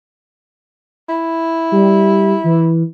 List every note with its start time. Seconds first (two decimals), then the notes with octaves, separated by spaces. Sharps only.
1.09 E4
1.72 G3
2.44 E3